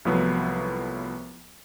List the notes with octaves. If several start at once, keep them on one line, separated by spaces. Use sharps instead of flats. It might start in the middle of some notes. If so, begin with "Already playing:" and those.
C2 A2 F3 F#3 B3